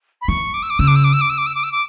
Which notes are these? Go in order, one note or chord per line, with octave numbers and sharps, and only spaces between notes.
B5
E3 C#6
D6
E6
D6
C#3 E6
D6
E6
D6
E6
D6
E6
D6
E6
D6
E6
D6